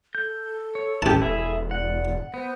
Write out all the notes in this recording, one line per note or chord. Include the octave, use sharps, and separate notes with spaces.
A4 G6
C#5
A1 E3 C#4 G4 A5
E1 E4 G#4 E5
D5 F#5
B3 C5